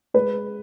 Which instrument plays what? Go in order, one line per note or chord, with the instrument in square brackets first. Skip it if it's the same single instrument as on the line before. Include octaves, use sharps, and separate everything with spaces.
[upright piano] G#3 B4